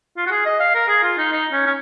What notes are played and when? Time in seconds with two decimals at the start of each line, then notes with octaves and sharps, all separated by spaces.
0.17 F4
0.27 F#4
0.31 G#4
0.46 D#5
0.60 F5
0.75 A#4
0.88 G#4
1.03 F4
1.18 D#4
1.32 D#4
1.52 C#4
1.66 C#4